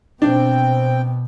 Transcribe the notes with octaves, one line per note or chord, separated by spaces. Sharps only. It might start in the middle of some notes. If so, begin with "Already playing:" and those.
B2 C4 D4 G5